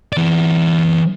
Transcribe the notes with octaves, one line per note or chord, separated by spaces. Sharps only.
E3 D5